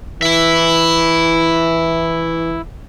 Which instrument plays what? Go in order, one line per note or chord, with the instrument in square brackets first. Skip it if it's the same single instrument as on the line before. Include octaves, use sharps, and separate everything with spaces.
[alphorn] E3 [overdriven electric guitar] E4 E5